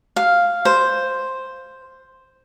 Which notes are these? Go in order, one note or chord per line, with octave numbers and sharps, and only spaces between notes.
F5
C5